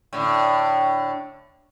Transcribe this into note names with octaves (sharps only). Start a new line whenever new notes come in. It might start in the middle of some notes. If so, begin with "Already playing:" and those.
A2 D3